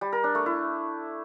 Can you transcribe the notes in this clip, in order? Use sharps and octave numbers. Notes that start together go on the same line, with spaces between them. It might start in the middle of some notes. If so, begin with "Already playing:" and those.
G3
A#4
D4
A3
E4